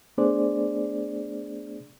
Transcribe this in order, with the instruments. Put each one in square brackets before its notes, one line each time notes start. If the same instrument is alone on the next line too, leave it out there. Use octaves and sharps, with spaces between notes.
[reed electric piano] A3 B3 D4 G#4 C5 D5